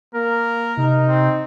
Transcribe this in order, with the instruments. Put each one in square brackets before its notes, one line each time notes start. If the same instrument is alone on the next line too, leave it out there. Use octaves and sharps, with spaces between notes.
[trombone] A#3 [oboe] A#4
[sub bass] C3 [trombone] D#4
[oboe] C4